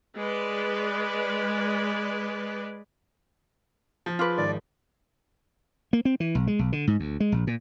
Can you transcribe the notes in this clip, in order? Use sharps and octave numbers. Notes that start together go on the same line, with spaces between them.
G#3 B4 D5
F3
F4 G#4 B4 C6 D6
G#1 D5
A#3
C4
E3
B1
G#3
B1
D3
G#2
D2
G#3
A#1
A#2